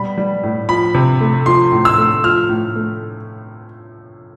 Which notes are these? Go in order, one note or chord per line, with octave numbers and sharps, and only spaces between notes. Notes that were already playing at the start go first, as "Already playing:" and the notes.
Already playing: B2 G3 B5
G3
A2
F3 B5
C3
A3
F3 C6
A2
E6
A3
F3 F6
A2
A3